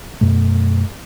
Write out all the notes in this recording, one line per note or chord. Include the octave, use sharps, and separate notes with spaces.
F#2 B2 A3